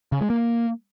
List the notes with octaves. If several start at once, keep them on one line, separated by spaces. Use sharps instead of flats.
C#3
G#3
A#3